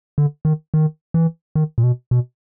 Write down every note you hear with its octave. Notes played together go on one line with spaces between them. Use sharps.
D3
D#3
D#3
E3
D#3
A#2
B2
B2